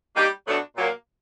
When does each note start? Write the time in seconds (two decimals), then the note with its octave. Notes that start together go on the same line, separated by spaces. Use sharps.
0.16 G3 A#3 D#4 G4
0.46 B2 F#3 A3 D4 F#4
0.76 A#2 F#3 A#3